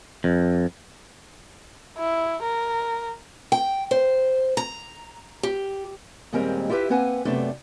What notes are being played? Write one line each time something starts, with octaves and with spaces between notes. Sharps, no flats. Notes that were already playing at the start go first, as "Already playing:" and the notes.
F2
E4
A#4
G5
C5
A#5
G4
D#2 A#2 G3 G#3 C4 A#4
E4 F4 G4 A4 B4 E5
A#3 C4 B4 F#5 G#5
F#2 C3 A3 B3 D4